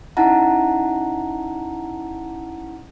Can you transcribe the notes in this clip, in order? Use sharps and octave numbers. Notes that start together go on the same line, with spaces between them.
C#4 D#4 E4 F#5 A5 A#5